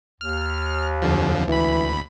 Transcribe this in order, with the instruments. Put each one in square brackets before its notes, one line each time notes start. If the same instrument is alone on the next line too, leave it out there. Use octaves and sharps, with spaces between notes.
[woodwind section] D#2 [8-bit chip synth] F6
[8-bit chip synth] F2 D3 F3
[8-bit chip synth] D2 B5 [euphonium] E3